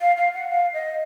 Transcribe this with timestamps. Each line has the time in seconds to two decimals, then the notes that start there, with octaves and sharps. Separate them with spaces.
0.01 F5
0.17 F5
0.34 F#5
0.50 F5
0.74 D#5